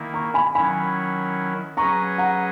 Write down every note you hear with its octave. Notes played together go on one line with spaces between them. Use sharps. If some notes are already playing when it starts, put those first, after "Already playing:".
Already playing: D#3 A#3 E4
A#5 C#6
G#5 B5
D#3 F#3 C#4 E4 G#5 B5
F#3 C#4 G#4 B4 D#5 A#5 C#6
F#5 A#5